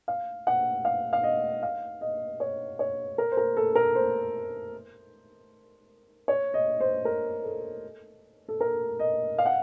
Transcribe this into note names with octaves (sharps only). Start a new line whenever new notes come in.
F5
F#5
F5
F5
D#5
F5
D#5
C#5
C#5
A#4
C5
A#4
A4
A#4
C5
C#5
D#5
C5
A#4
A4
A4
A#4
D#5
F5
F#5